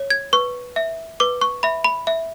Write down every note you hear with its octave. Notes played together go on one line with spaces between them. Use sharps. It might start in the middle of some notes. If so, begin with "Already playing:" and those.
Already playing: C#5
G#6
B4 C#6
E5
B4 D6
C#6
E5 B5
B5
E5